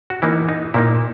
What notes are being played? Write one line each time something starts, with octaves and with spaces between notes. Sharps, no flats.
F#4
E3 A#3 D#4 E4
D#4
A#2 A#3 D#4 E4